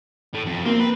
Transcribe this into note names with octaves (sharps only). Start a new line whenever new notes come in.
A2
F2
A#3 C4
B4